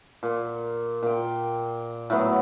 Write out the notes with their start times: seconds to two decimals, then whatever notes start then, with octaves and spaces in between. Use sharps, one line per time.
0.23 A#2
1.03 A#2 G5
2.10 A2 F#3 B3